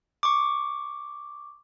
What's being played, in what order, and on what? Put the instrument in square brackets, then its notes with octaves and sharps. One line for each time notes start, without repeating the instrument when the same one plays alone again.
[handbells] C#6 D6